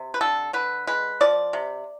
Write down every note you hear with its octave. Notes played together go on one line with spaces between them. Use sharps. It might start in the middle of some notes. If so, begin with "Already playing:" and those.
Already playing: C3
B4
D3 A4
D3 B4
G#3 B4
F3 D5
C3